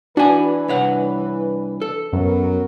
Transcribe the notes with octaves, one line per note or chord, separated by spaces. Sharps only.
E3 D4 F#4 B4 G#5
C2 C#5 F#5
A4
F#2 F#3 B3 A#4